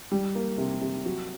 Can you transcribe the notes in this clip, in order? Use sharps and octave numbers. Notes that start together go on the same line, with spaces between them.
G3
A#3
C3
C3
F#3